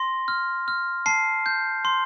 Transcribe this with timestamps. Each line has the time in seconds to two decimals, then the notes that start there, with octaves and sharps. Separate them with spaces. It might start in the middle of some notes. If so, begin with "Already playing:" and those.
Already playing: C6 A#6
0.28 F6
0.68 F6
1.06 A5 C7
1.46 G6
1.85 C6